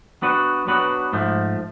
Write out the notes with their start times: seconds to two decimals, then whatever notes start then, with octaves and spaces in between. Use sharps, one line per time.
0.22 F#3 B3 D4 F#4 B4
0.67 F#3 B3 D4 F#4 B4
1.13 G#2 F3 A3